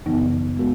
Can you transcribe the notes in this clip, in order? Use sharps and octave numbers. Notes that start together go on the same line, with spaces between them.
F#2 C#3 E3 B3 D#4
G#3 B3 F#4 A#4